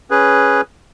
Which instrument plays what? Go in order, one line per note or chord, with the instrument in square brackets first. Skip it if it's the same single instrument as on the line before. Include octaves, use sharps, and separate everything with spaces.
[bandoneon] C#4 G#4 B4